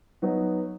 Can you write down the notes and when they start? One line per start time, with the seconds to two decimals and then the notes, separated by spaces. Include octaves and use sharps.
0.22 F#3 B3 D#4 F#4